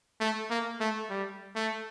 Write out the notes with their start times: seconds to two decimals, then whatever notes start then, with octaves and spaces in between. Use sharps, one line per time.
0.21 A3
0.50 A#3
0.80 A3
1.10 G3
1.55 A3